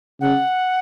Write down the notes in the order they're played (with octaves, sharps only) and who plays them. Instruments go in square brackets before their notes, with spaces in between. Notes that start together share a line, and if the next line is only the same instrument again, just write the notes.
[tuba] C#3 [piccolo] F#5